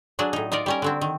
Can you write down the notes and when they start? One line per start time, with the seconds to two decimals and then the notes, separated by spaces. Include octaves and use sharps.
0.19 F#3 D4 G#4
0.33 A2 D#4
0.52 D#4 F4 A#4 D5
0.66 G3 C#4 A#4
0.82 D3 F#3 C4
1.01 D#3